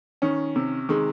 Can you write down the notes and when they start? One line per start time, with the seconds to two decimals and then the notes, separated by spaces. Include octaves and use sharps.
0.22 D#3 C#4
0.56 C3
0.89 D#3 G#3